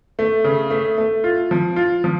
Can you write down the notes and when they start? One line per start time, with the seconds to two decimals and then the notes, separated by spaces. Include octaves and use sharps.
0.19 A3
0.44 C#3
0.70 A3
0.98 A3
1.24 F4
1.51 F3
1.76 F4
2.04 F3